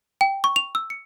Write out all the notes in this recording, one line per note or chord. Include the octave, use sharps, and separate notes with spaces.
G5
C#6
F7
E6
C#7